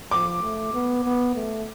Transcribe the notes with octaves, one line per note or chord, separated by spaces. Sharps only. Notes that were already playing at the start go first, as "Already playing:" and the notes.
F3 D6
A3
B3
B3
A3